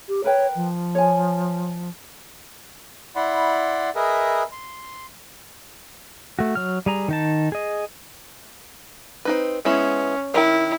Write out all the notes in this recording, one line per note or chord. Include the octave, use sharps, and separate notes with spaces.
G4
A#4 B4 C#5 G5
F3
C#5 G#5
E4 D5 F#5 B5 C6
G#4 A#4 B4 D#5 E5
C6
A3 F#4
F#3 F6
G3 G#4 A#5
D#3 D#4 A5
G#4 D#5
C4 D#4 B4
G#3 B3 C#4 E4
D#3 E4 A#4 G5